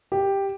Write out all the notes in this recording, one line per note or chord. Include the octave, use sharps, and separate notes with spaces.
G4